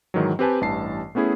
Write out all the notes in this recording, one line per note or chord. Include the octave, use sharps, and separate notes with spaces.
G#2 D#3 E3 F#3
C4 G4 B4 G#5 A5
A1 G2 E3 A5 C7
A3 B3 C#4 E4 G#4